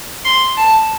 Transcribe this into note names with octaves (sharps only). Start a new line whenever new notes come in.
C6
A5